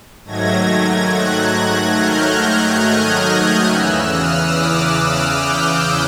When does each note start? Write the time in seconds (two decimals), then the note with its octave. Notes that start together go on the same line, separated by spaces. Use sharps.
0.25 G#2 D#3 F#3 A3 G#6 A#6
1.10 F#6 G#6
1.96 F6 G6
2.81 D#6 F6
3.66 E2 C#3 E3 E6 F#6
4.09 D#6 F6
4.51 D6 E6
4.94 D#6 F6
5.37 F6 G6